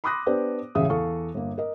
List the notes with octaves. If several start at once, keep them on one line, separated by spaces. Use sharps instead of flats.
B5 C6 D6 D#6 F#6 A#6
B3 D4 G4 B4 C5 D5
E1 A1 C#3 E5 D#6
E2 A4 F5 C#6
G1 A#3
A#4 D#5